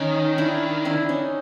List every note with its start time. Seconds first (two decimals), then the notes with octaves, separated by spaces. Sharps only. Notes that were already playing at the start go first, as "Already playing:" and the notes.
Already playing: D#3 C#4 D#4
0.38 D4 E4
0.85 D4 E4
1.09 C#4 D#4